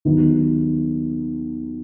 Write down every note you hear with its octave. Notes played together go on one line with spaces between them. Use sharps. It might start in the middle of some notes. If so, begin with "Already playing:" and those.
D#2 D#3 F#3 B3